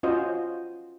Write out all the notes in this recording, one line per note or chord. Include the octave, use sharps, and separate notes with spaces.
C#4 F4 F#4 C5 D#5